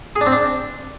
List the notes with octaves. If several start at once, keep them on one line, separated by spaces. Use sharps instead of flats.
G#4
D4
C4
D4